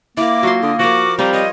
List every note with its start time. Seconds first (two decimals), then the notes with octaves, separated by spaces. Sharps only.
0.17 A#3 E4 A#4 D6
0.43 F#3 F4 A4 C6
0.63 D3 D#6
0.79 F3 F#4 A#4 D6
1.19 G3 C4 F5 A#5
1.34 C#5 D#5